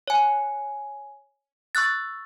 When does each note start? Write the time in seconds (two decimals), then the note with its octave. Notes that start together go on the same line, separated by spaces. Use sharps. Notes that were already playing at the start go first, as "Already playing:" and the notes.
0.08 C#5 G#5
1.75 C#6 E6 F#6 A6